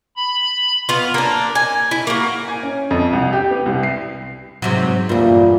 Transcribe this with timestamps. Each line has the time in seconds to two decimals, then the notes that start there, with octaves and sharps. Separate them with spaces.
0.16 B5
0.89 B3 F4
1.14 A#3 D4
1.55 G#5
1.91 E4
2.07 A#3 F#4
2.48 G#5
2.63 C#4
2.91 F2
3.13 C2
3.33 G4
3.51 B3
3.66 C2
3.83 C7
4.62 G#2 C3 F#3
5.09 E2 G2 A#2